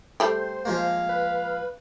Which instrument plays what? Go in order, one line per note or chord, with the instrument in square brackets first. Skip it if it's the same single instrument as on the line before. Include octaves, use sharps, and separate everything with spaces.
[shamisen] G3 A3 G5 [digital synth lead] C5
[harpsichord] F3 G#3 A#3 [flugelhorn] F5
[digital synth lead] B4